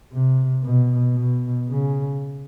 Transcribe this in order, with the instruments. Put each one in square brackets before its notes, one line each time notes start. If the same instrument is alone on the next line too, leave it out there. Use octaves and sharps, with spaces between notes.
[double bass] C3
B2
B2
C#3